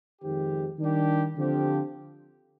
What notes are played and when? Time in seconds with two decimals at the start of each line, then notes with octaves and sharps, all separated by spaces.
0.21 F2 D#3 G#3 C4 G4
0.79 D#3 G3 D4 G4
1.36 D3 F3 C4 G4